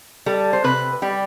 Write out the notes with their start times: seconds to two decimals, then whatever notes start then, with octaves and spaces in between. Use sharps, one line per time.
0.26 G3 A4
0.53 C5
0.64 C3 B4
1.02 G3 G4